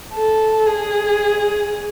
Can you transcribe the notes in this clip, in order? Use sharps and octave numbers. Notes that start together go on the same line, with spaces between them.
A4
G#4